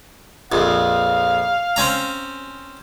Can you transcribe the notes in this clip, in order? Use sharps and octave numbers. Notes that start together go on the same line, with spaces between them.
A#1 F2 F5
C4 C#4 A#5